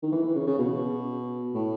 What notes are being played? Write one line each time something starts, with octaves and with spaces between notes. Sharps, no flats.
D#3
E3
E3
C#3
C#3
B2
A2